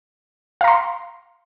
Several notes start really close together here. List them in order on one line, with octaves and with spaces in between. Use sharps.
F5 A#5 C6